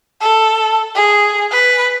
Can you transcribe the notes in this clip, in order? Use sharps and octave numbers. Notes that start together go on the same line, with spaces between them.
A4
G#4
B4